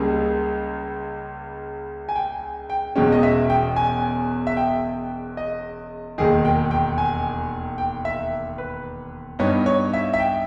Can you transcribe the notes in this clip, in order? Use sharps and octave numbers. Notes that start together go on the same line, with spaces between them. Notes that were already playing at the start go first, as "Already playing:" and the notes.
Already playing: C#2 C#3 G3 A#3 G#4
G#5
G5
G5
E1 E2 B2 G#3 C#4 G5
D#5
E5
G5
G#5
E5
G5
D#5
E1 D#2 D#3 G#4
G5
G5
G#5
G5
E5
B4
G2 G3 B3 D#4 C#5
C#5
E5
E5
G5